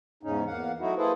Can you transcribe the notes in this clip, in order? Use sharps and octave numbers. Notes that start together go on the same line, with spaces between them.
E2 G#2 C#3 C#4 D#4
E2 A#3 F5 F#5
F#3 A3 D#4 E4 F#4
A#3 E4 G#4 A4 B4 C5